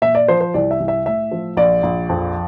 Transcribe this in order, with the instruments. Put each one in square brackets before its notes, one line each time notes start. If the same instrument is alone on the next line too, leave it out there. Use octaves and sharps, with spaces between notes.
[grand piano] A#2 E5
D5
F3 C5
C5
C2 D5
E5
C2
E5
A2 E5
F3
A#1 D5
A#1
F2